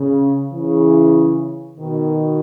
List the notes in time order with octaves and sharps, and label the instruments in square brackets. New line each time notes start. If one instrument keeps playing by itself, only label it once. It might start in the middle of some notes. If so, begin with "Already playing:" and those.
Already playing: [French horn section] C#3
C#3 E3
B2 D#3